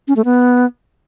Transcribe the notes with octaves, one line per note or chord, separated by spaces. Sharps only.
C#4
A3
B3